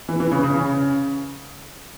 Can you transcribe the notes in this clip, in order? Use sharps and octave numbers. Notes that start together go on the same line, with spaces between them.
E3
E3
C#3
C#3
C#3